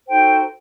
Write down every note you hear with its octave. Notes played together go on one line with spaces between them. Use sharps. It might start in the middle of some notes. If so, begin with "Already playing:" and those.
D#4 F#4 A4 C5 G5